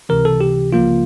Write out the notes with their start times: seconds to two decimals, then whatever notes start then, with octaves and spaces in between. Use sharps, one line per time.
0.09 C#2 C3 E3 A#4
0.25 A4
0.41 G4
0.73 C#2 C#3 F3 A#3 F4